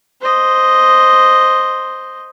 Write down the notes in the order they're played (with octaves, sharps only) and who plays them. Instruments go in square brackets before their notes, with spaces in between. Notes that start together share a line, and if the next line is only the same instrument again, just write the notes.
[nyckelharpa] C5 D#5